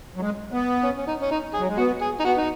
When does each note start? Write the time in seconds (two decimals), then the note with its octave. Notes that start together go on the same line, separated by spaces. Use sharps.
0.16 F#3
0.21 G#3
0.52 B3
0.83 C#4
0.97 C#4
1.07 D#4
1.22 C#4
1.31 D#4
1.54 G#4
1.58 F#3
1.68 G#3
1.77 B3 F#4
2.01 G#4
2.20 D#4
2.24 B3 F#4
2.37 D#4